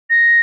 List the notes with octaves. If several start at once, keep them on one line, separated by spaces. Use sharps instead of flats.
A#6